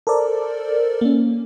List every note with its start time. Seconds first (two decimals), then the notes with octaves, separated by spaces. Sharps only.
0.07 A4 A#4 C5 D5
1.01 A#3 C#4